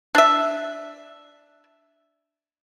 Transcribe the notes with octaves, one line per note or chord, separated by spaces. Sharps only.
D4 E5